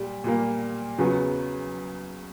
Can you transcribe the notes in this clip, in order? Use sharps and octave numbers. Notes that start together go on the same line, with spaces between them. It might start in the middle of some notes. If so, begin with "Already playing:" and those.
Already playing: A#2 G3
A#2 G3 A#3
E2 C#3 F#3 B3